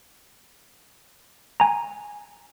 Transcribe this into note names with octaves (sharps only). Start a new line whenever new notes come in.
G#5 A#5